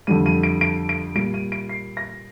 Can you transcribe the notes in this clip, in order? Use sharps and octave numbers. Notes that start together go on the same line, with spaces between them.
F2 D3 G3 D#7
D#7
D7
D7
D7
A#2 G3 D7
D#7
D7
C7
A#6